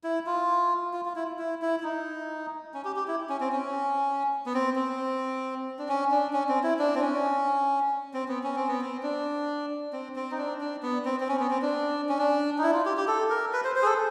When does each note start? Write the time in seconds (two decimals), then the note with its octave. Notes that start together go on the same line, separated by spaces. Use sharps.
0.04 E4
0.26 F4
0.93 F4
1.05 F4
1.16 E4
1.39 E4
1.62 E4
1.80 E4
1.83 D#4
2.74 C#4
2.84 G4
2.96 G4
3.08 E4
3.29 C#4
3.41 C4
3.52 C#4
4.46 B3
4.54 C4
4.76 C4
5.79 D4
5.88 C#4
6.11 D4
6.33 C#4
6.49 C4
6.63 E4
6.79 D4
6.95 C4
7.01 C#4
8.14 C4
8.28 B3
8.43 C#4
8.56 C4
8.68 B3
8.81 C4
9.03 D4
9.93 C4
10.16 C4
10.31 D#4
10.38 D4
10.60 D4
10.83 B3
11.05 C4
11.20 C4
11.29 C#4
11.39 B3
11.50 C4
11.62 D4
12.09 C#4
12.19 D4
12.58 D#4
12.63 E4
12.74 F4
12.86 G4
12.97 G4
13.08 A4
13.30 A#4
13.53 B4
13.64 C5
13.76 C5
13.82 G#4
13.86 A4